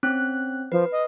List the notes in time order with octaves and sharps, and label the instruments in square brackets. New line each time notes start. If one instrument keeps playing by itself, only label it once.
[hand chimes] C4 C#4 F#6
[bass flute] F3 [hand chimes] B4
[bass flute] D#5